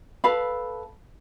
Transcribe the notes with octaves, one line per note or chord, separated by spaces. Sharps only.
A4 B4 F5 B5